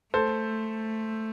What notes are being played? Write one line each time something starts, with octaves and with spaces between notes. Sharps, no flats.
A3 A4 C5